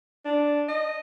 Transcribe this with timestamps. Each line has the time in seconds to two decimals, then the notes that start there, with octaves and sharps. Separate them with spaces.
0.25 D4
0.68 D#5